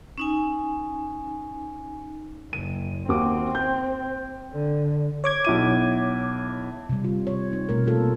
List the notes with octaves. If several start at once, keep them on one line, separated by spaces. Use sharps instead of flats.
C#4 D#4 G#5
F#1 D#7
D#2 C4 F#4 D6
G5 G6
D3
C#5 D6 G#6
B1 E4 D#7
C3 G3
F4
C#5
C4 D#4
B2 A3 C4 A#4
A3 A#3 F4 A4